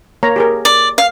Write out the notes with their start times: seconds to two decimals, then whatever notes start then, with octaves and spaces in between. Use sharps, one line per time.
0.23 A#3 C#5 A#5
0.36 G4 G#4 A#4
0.65 D5
0.98 F5